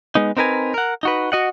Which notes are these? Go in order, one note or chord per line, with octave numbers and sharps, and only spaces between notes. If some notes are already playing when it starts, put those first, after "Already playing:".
G#3 B3 D#4
C4 D#4 A#4 B4 G#5
A#4 F#5
D#4 F#4 B4
F#4 D#5 F#5